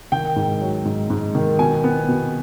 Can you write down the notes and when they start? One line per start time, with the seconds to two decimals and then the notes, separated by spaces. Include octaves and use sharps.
0.12 D#3 G5
0.36 G#2
0.61 F#3
0.85 G#2
1.10 G#2
1.35 D#3
1.59 B2 G#5
1.84 B3
2.08 B2